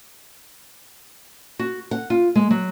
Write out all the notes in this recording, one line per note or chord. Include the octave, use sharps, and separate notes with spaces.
F#4
F#5
F4
G#3
F#3